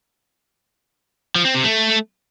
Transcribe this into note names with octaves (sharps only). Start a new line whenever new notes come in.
F3
C4
C3
A3